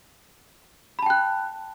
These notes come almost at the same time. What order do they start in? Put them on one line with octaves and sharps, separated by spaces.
B5 A5 G5 F#6